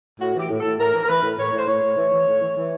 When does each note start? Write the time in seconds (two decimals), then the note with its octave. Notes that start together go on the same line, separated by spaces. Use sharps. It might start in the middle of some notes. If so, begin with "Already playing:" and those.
0.20 A2 F#4
0.35 E3 G4
0.49 A2
0.60 A2 A4
0.78 A2 A#4
0.94 E3
1.03 A#4
1.09 E3 B4
1.23 A2
1.38 A2 C#5
1.53 A2 C5
1.67 A2 C#5
1.82 A2
1.97 E3
2.12 E3
2.27 A2
2.42 E3
2.57 E3